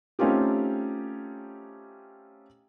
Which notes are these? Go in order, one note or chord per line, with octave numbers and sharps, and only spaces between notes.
A3 C4 C#4 D#4 F4 G4